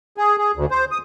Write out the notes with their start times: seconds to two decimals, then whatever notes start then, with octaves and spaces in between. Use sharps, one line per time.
0.17 G#4
0.38 G#4
0.56 D2
0.71 C5
0.91 D#6